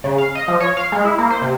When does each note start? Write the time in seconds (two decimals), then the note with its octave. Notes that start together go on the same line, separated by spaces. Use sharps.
0.04 C#3
0.18 F5
0.35 D#5
0.48 F3
0.60 C#5
0.77 F5
0.92 G#3
1.05 E4
1.18 A#3
1.30 C5
1.42 C3